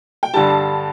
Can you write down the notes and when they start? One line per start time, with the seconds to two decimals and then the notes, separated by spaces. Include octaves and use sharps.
0.23 G5
0.34 G2 D3 G3 A5